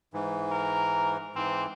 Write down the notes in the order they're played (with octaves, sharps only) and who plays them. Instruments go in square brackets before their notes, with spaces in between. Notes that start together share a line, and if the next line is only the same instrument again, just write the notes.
[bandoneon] G#2 E3
[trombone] A#4
[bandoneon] G#2 E3 [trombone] C4